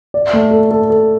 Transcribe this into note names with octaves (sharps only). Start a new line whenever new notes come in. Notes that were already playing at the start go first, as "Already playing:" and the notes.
D5
A3
A4
A4
A4